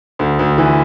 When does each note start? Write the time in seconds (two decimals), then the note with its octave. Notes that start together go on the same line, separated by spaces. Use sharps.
0.19 D2
0.39 D2
0.58 E3